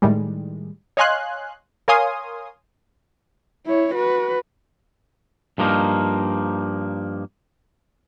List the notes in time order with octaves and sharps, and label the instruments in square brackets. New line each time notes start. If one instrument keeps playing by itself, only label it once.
[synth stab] A2 D#3 G3 G#3
C#5 D#5 F5 G#5 C6 F#6
A#4 C#5 F5 G#5 C6 D#6
[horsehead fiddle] E4 C#5
F#4 B4
[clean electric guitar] G2 F3 A#3 D#4